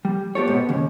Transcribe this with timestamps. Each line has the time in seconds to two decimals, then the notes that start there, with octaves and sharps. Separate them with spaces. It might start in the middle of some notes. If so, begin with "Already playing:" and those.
0.05 G3
0.35 B3 G4 A4 C#5
0.48 G#2 B2 B3
0.69 D#2 C#3